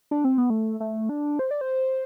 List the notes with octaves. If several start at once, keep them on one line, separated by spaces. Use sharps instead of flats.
D4
C4
B3
A3
A3
D4
C5
D5
C5